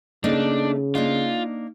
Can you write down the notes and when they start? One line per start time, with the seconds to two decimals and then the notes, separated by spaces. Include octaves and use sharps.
0.24 C#3 A3 A#3 D4 D#4
0.95 A#3 D4 D#4 F4